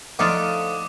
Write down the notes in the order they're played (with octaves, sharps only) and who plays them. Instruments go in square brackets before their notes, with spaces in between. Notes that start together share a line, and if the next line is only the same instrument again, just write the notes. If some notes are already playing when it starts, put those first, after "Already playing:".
[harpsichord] D3 F3 A3 [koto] D#4 F4 D5 [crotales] D6 D#6